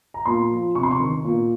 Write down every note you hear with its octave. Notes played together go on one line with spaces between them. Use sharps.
A#5
A#2 C6
F3
C3 C#6
C6
C#6
D#3
A#2